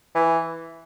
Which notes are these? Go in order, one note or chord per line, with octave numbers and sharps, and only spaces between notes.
E3